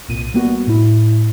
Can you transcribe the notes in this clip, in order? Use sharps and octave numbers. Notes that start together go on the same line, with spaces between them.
C2 A#2 D#7
G3 A#3 B3 F#4
A2 E4